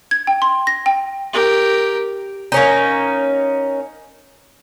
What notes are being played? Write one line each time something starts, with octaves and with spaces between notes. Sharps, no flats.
G#6
G5
C6
A#6
G5
G4 A#4
A#3 C#4 D#4